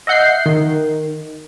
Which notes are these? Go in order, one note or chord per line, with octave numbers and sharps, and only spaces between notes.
D#5 E5 F#5 G6 C7
D#3